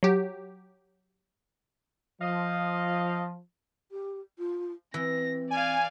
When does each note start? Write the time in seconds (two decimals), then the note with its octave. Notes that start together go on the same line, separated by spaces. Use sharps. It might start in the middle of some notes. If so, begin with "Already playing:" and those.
0.03 F#3 G4
2.21 F3 D#5 F5
3.92 G4
4.39 F4
4.94 E3 C4 A#6
5.51 D5 F5 G#5